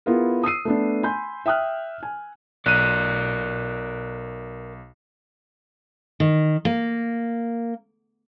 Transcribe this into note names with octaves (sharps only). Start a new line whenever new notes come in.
B3 E4 F4 G#4 A#4
D#6 E6 C7 D#7
A3 B3 D4
G#5 B5 C6 G6
E5 G5 D#6 F6 F#6
G#5
B1 A#4 D5 F#6 D#7
D#3
A#3